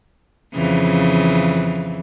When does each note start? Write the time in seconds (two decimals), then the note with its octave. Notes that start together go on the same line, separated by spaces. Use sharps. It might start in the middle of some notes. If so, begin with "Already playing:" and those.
0.54 F2 C#3 E3